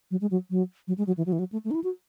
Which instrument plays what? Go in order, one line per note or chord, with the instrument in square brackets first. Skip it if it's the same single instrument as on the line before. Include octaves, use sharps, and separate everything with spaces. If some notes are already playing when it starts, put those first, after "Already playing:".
[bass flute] F#3
G#3
F#3
F#3
F#3
G#3
F#3
E3
F#3
E3
F#3
A3
A3
D#4
E4
F#4